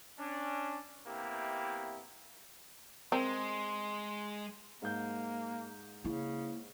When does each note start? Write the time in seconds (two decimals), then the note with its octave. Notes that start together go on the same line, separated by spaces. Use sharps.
0.18 C#4 D4
1.07 C3 A#3 B3 E4 G4
3.12 G#3 C4 A#4 C6
4.82 G#2 A#3 G6
6.04 C#3 A#3 E4